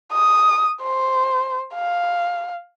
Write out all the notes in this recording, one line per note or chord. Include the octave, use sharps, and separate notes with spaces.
D#6
C5
F5